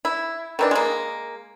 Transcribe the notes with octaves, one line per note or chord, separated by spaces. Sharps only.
E4
D#3 E3 D4
G#3 A#3